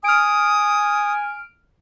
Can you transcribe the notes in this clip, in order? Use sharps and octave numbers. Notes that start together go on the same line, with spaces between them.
G#5 D#6 F6 D7